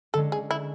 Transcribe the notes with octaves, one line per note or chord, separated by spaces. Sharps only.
D3 G#3 C#4 A4
G#4
E4